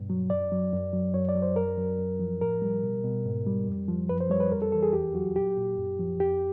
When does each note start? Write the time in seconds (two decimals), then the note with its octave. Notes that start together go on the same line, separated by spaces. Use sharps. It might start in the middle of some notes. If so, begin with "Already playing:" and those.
Already playing: G2 B2
0.10 F#3
0.30 F#2 D5
0.52 F#3
0.73 F#2
0.93 F#3
1.14 F#2 C#5
1.29 D5
1.36 F#3
1.42 C5
1.56 F#2 A#4
1.77 F#3
1.98 F#2
2.20 F3
2.41 A2 A#4
2.62 G3
2.84 B2
3.04 B2
3.26 G#2
3.46 G3
3.67 F2
3.88 F3
4.09 F#2 B4
4.20 C5
4.30 G3 C#5
4.40 B4
4.52 F2 A#4
4.62 A4
4.72 E3 A4
4.83 G#4
4.93 E2 G4
5.14 F#3 F#4
5.36 A#2 G4
5.57 A#2
5.77 F#2
5.99 F3
6.20 F2 G4